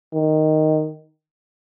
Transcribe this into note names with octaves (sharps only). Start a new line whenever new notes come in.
D#3